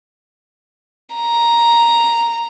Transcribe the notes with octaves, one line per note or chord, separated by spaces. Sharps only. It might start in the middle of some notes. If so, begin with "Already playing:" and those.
A#5